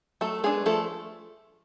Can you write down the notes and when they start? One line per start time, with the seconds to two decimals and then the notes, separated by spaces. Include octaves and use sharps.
0.21 F#3 A3 A4
0.44 G#3 B3 D4 G#4
0.66 F3 A3 A4